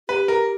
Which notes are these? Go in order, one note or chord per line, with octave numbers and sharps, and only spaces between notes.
G4 B4
A#4